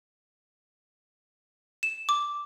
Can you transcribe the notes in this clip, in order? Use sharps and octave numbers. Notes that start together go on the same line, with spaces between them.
E7
D6